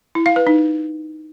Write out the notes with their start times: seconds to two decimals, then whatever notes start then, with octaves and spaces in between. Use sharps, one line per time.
0.15 E4
0.26 F5
0.36 B4
0.47 D#4